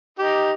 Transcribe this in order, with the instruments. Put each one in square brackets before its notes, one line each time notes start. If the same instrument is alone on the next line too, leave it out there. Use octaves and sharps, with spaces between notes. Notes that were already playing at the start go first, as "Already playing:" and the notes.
[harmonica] D#4 G4